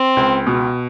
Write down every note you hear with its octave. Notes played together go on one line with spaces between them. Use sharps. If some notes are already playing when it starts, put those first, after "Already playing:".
Already playing: C4
C#2
B2